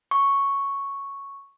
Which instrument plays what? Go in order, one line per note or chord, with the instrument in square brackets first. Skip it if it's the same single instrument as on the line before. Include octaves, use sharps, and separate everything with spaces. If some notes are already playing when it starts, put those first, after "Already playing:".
[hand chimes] C#6